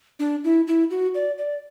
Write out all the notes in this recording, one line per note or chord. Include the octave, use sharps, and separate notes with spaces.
D4
E4
E4
F#4
D5
D5